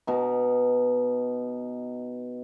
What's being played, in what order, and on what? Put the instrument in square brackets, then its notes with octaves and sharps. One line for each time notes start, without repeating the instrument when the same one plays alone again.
[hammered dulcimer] B2 D#4